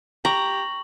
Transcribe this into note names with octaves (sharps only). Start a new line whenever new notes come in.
G4 A#5 C#6 F#7